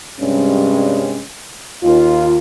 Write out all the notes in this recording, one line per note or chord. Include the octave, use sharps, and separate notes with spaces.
G2 C3 G3 G#3 C#4
D#2 F4